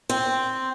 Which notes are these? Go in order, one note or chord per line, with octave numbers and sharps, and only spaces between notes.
C4